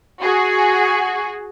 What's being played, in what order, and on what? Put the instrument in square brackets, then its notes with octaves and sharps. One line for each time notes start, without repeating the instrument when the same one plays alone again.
[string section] F#4 G#4